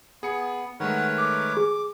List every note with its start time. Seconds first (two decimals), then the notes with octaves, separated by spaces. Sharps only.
0.23 B3 G#4 C#7
0.80 D#3 G#3 A3 A#4 B4 C#5 F#5
1.18 D6
1.57 G#4